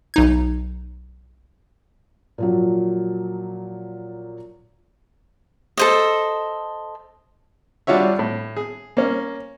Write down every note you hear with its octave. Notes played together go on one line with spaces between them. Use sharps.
B1 D#4 G#6
A#2 F3 F#3
A4 C5 D#5
G3 D4 F4 F#4 C#5 E5
A2
G#4
A#3 C#4